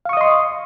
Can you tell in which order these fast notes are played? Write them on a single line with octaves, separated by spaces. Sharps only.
F5 C#6 D#6 D#5 C6